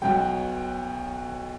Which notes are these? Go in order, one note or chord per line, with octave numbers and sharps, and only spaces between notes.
B1 B2 F#3 G5